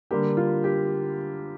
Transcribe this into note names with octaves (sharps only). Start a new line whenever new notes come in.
D3 G3 A#3 G4
F4
G4